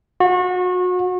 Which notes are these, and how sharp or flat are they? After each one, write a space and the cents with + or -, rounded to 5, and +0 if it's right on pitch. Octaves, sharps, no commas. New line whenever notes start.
F#4 -35